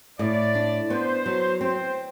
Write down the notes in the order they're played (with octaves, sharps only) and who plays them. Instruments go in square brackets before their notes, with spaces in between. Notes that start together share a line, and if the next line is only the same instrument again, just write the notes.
[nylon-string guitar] A2 [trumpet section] D5
[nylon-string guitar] D4
[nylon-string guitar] B3 [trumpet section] C5
[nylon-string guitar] F#3
[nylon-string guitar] C4 [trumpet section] C5